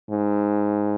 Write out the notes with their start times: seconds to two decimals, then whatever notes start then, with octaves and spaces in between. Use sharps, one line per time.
0.10 G#2